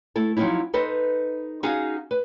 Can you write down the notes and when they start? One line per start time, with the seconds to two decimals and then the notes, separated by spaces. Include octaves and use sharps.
0.15 A3 E4 A4
0.37 F3 F#3 C4 C#4 D#4 E4
0.73 D#4 A4 B4 C5 D#5
1.63 C#4 D#4 F#4 G#4 F5 F#5
2.11 B4